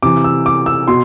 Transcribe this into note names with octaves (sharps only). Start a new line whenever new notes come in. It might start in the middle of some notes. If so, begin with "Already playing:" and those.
C3 E3 D6
E6
D6
E6
B2 C6